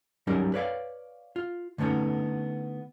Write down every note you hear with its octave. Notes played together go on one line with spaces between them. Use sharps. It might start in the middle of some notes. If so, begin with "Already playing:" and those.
F#3 G3 C#4 D#4 A#4
B4 C#5 D5 F5
F4
D3 A3 B3 C#4 D#4